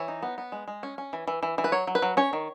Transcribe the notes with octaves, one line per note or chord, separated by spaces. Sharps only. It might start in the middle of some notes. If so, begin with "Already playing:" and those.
Already playing: E3 C#5
D#4
B3
B3
G#3
G#3
C#4
C#4
E3
E3
E3
E3
B4
F#3 C#5
F#3
B4
F#3
C#4 C#5
D#3